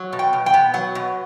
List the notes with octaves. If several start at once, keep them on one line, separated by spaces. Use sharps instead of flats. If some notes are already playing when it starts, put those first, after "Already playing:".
Already playing: F#3
B2
G5
B2
G5
B3
F#3 F#5
B2